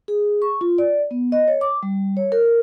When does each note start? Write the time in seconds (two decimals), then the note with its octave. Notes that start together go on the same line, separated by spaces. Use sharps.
0.08 G#4
0.42 C#6
0.61 F4
0.78 D5
1.11 B3
1.32 D#5
1.48 C#5
1.61 D6
1.83 G3
2.17 C#5
2.32 A#4